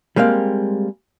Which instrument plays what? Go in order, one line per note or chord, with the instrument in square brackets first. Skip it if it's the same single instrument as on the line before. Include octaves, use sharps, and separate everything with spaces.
[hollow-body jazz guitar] G3 G#3 A#3 C4 F5